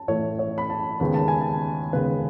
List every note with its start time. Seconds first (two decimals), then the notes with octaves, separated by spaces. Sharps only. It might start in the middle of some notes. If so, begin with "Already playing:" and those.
Already playing: A5
0.08 A2 E3 A3 C#5
0.39 C#5
0.58 B5
0.70 A5
1.00 D#2 C#3 G#3 B3 B5
1.14 A5
1.28 G#5
1.41 A5
1.93 D#2 C#3 G#3 B3 B4